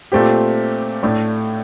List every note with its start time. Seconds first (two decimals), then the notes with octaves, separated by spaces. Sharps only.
0.12 A#2 A3 C4 G4
1.03 A2 A3 D4